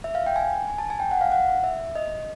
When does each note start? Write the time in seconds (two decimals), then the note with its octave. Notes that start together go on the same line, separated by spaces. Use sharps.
0.04 E5
0.15 F5
0.26 G5
0.36 G#5
0.68 G#5
0.78 A5
0.90 G#5
1.00 G5
1.11 F#5
1.21 F5
1.32 F#5
1.64 E5
1.95 D#5